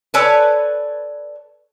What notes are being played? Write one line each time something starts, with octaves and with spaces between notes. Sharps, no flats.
A4 B4 C#5 D5 G#5 A5